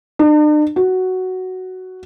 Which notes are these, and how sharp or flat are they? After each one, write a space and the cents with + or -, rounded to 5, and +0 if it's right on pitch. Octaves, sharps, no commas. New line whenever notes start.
D4 +45
F#4 +5